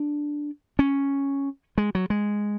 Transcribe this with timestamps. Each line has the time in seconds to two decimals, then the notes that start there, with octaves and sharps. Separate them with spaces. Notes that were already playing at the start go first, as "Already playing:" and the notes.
Already playing: D4
0.79 C#4
1.78 G#3
1.95 F#3
2.10 G#3